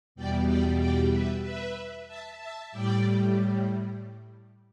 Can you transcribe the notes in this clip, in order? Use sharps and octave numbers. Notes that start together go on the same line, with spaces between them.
E2 B2 G3 D5 G5
D5 G5
D5 G5
B4 E5
B4 E5
E5 A5
E5 A5
A2 G3 D5 G5